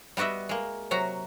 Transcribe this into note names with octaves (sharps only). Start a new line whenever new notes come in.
G3 B3 F#4 D#5 E5
G#3 A#3
C3 F#3 F#4 A#5